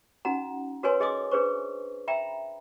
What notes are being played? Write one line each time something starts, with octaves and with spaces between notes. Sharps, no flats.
C#4 D#4 F#4 F#5 A#5
F#4 A#4 B4 C#5 G#5 C6
G#4 D#5 G#5 C6 D6 D#6
D4 G#4 B4 C5 C#6
E5 G5 A#5 B5